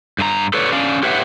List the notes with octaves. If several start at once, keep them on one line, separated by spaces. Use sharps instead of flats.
G2 G#4 A#5
A4 B4 C#5 D5
C#4 D4 D5 F5
G4 B4 C#5 E5 F#5 G5